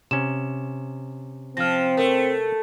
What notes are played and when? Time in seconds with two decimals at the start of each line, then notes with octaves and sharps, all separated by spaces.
0.11 C3 C#4 E7
1.57 F3 C4 F6 A#6
1.97 A3 A#4